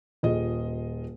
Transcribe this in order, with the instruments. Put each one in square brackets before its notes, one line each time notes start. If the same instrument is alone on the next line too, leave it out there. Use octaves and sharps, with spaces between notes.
[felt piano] D#1 F4 G#4 D#5